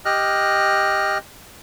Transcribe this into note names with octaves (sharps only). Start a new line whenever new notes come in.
G4 D#5 F6 F#6